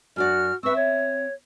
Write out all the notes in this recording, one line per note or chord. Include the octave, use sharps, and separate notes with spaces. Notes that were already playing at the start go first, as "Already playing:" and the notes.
F#2 D4 F#4 D5 F6
C4 B4 E5 C#6 E6
C#5